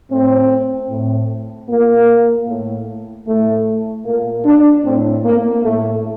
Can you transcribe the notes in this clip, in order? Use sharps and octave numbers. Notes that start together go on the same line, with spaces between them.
A2 C4
A2
A#2 A#3
A2
A2 A3
A#2 A#3
D4
A2 C4
A#3
A2 A3